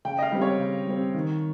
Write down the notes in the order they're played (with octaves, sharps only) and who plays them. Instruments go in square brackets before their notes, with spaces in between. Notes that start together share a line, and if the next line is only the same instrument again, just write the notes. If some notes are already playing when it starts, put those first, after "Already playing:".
[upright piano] C#3 G5
D#5
F5
G3 C4
C#5
C#3
G3 C4
D#3